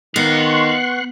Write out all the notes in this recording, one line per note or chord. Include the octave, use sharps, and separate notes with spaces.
D#3 B3 D#5 F5 C6 C#6 F#6